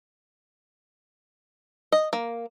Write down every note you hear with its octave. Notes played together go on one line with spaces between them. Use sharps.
D#5
A#3